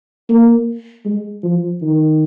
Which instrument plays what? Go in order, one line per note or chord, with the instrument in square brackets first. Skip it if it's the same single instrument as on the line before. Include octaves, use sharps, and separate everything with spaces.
[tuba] A#3
G#3
F3
D#3